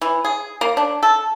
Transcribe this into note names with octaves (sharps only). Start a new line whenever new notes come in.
E3
G#4
A#3
D4
A4